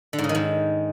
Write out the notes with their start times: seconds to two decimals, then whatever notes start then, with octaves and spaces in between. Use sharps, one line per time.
0.13 D3
0.18 G#2
0.24 C#3
0.29 D#3
0.35 G#2